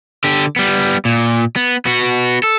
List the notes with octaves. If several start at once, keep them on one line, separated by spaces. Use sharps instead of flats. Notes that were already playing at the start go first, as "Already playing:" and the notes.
D3 G4
G3 B3
A#2
B3
B3 F#4
A4